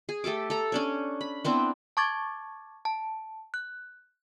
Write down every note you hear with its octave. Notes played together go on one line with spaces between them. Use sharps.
G#4
A3 G4 A4 D6
A4 A#5
C#4 D4 C#5
B5
B3 C4 D4 E4
A5 C#6 D6 G#6 A6
A5
F#6